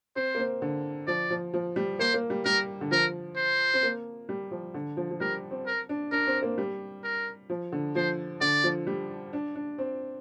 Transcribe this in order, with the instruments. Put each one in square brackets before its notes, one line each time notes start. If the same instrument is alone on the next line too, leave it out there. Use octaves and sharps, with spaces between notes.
[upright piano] C4 [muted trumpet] C5
[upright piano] A#3
C4
D3
[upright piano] F3 [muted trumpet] D5
[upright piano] F3
F3
G3
[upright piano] A#3 [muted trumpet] C5
[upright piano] A#3
G3
[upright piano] G3 [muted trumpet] A#4
[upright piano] D3
[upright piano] F3 [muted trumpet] A#4
[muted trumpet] C5
[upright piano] C4
A#3
G3
F3
D3
F3
F3
[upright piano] G3 [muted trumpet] A#4
[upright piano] C4
[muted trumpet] A#4
[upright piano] D4
[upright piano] D4 [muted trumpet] A#4
[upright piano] C4
A#3
G3
[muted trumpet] A#4
[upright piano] F3
D3
[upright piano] F3 [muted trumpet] C5
[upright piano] D3 [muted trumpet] D5
[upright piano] F3
G3
D4
D4
C4